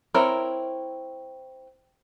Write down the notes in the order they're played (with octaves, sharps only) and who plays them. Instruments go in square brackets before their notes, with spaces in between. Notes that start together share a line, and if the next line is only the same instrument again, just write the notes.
[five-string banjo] C4 E4 A#4 C#5